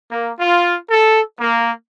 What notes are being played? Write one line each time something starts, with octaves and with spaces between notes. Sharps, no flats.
A#3
F4
A4
A#3